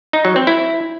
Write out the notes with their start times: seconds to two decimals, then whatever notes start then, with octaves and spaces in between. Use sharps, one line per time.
0.13 D#4
0.25 F#3
0.36 C4
0.47 E4